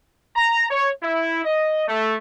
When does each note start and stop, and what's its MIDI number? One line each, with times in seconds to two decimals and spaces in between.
0.36 0.68 82
0.70 0.90 73
1.03 1.44 64
1.45 1.88 75
1.88 2.15 57